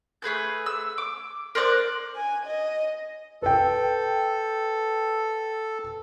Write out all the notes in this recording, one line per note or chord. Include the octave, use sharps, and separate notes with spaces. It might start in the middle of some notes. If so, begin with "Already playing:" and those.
A3 G#4 B4 G6
E6
D6
A#4 C5 D5 F#6
G#5
D#5
A4 B4 G5